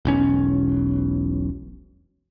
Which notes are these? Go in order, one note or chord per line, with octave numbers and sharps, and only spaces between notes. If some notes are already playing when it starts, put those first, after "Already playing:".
E1 B1 C#4